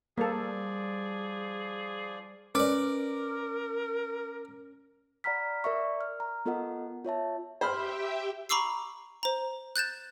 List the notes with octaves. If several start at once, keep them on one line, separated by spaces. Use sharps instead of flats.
F3 G3 A#3 G#4 A4 D5
C#4 A#4 B4 D5 D6
D5 F#5 A#5 B5 F6 B6
A#4 D5 E5 C#6
F6
A#5
B3 F4 A4 A#4 D#5 F#5
F4 C#5 E5 A5
G4 C5 E5 G5 B5 F6
A#5 B5 C#6 D6 E6 C7
C5 A#5
F#6 G6 A6 E7